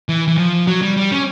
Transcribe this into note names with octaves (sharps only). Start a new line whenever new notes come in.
E3
E3
F3
F#3
G3
G3
C#4